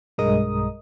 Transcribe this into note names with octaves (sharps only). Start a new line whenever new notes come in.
B1 G2 G#3 A#4 D#5 D#6